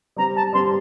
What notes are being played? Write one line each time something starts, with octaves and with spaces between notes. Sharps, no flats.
G3 C4 G4 A#5
A5
G3 C4 G4 C6